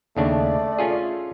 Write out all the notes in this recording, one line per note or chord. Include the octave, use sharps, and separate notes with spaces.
D#2 C#3 A3 D4 D5
C#4 F4 G#4